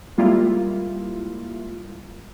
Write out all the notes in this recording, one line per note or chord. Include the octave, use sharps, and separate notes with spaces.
G3 G#3 A#3 E4 F4